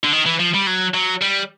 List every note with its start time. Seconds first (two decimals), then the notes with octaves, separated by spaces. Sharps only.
0.04 D3
0.13 D#3
0.26 E3
0.39 F3
0.54 G3
0.67 F#3
0.94 F#3
1.22 G3